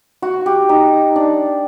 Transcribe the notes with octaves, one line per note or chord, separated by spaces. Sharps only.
F#4
G4
D#4
D4